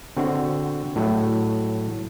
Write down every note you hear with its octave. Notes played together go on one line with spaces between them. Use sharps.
D3 C4 F#4
A2 F#3